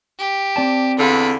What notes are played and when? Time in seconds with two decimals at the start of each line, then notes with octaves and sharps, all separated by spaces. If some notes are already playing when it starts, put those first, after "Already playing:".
0.19 G4
0.56 C4 D5 A5
0.99 E2 D3 F4 B5